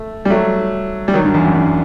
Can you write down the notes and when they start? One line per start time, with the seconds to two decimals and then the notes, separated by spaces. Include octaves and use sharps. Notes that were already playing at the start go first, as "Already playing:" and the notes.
Already playing: A3
0.25 G3
0.30 F#3 A3
1.08 G3
1.14 D#3 F#3
1.25 G2
1.34 E2
1.45 F#2
1.55 G2